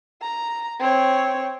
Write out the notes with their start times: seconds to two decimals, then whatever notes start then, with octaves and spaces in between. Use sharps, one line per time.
0.21 A#5
0.80 C4 C#5